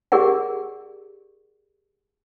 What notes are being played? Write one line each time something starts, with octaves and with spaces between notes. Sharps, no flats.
G4 G#4 A#4 D5 F#5